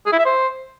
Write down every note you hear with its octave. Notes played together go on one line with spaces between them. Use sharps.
G#4
E4
E5
C5